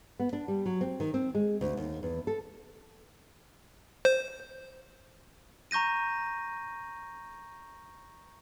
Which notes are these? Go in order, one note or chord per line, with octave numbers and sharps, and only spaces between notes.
B3
D4
G3
F#3
C4
D#3
C4
G#3
D2
D#2
E2
A4
C5
A#5 C#6 G6 A#6 D#7